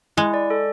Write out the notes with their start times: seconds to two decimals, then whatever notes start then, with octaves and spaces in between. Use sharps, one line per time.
0.17 G#3 E4
0.34 D5
0.50 A4